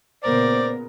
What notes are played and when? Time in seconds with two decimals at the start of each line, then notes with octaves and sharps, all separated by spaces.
0.23 A#2 C#3 B3 A#4 C5 D5